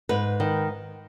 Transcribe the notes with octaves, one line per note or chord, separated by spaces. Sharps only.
G#2 B4
D#3